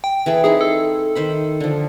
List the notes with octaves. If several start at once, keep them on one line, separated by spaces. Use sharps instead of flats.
G5
E3 G#4 A4
C4 D#4 E4 G#4
A4
D#3 C5 B5
D3 F3